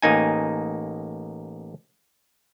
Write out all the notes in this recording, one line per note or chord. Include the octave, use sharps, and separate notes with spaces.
A1 A#3 D#4 G#5